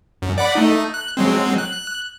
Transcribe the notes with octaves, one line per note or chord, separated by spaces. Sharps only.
F#2
D5 F#5 B5
A3 D#4
F#6
F#3 G#3 C4
F#6